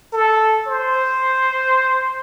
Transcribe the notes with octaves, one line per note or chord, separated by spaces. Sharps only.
A4
C5